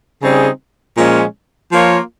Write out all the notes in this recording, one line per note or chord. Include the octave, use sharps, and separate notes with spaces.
C#3 G3 C4 D#4 G#4
A#2 F3 G#3 C#4
F3 A#3 F4 A#4 C#5